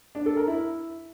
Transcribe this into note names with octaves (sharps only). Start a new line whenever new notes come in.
D4
A4
A#4
E4